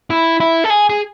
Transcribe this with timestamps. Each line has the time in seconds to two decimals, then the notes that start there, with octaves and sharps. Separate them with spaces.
0.10 E4
0.40 E4
0.64 A4
0.70 G#4
0.90 G#4